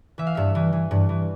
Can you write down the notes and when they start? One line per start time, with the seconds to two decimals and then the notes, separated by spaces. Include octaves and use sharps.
0.18 E3 E5
0.27 F5
0.35 G2 E5
0.55 E3
0.72 E3
0.91 G2
1.09 E3